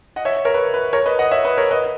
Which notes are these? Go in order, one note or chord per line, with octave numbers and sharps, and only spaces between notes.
D#5 F#5
C#5 E5
A#4 C#5
B4
B4
A#4 C#5
B4 D#5
D#5 F#5
C#5 E5
B4 D#5
A#4 C#5
B4 D#5